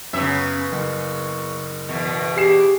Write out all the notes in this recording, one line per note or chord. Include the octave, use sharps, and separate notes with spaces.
F#2 C#3 B3 E5
F#1
E2 B2
G4 G#4 C7 E7